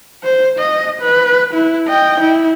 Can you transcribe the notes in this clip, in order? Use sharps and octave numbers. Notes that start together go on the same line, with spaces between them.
C5
D#5
B4
E4
D#5 G5
E4